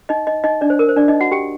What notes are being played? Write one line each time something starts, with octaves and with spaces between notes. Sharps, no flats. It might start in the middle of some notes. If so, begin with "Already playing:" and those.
D#4 D#5
D#4 D#5
D#4 D#5
D4 D5
C5
A#4
C5
D4 D5
D#4 D#5
F#4 F#5
G4 G5